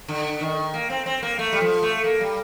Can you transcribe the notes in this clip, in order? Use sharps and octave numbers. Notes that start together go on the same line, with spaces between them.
D3
D#3
A#3
C4
C4
A#3
A3
G3
F3
A3
A#3
G3